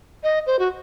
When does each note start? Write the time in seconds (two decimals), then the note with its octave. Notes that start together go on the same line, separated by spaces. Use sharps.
0.23 D#5
0.47 C5
0.59 F#4